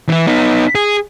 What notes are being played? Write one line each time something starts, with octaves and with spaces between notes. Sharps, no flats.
E3 E4
B3 D#4
G#4